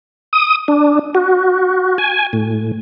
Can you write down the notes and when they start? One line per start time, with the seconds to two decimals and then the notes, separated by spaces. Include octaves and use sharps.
0.33 D#6
0.68 D4
1.15 F#4
1.98 G#5
2.33 A2